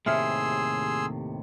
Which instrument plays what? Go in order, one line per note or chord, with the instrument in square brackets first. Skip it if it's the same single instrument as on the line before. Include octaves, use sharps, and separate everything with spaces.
[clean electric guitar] D#2 A2 C3 [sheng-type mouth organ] G#4 C6 E6 [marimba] E5 F6